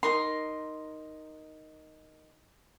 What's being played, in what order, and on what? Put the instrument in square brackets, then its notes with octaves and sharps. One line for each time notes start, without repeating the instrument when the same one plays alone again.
[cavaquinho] D#4 A#4 C6